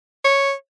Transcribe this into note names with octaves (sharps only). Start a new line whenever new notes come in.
C#5